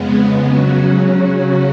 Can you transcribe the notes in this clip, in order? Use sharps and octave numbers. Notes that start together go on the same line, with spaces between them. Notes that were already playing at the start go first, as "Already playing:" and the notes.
Already playing: F2 C#3 G#3 B3
C#3 F#3 C#4 F#4